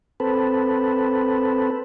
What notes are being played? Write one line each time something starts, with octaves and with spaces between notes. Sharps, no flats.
C4 A4 B4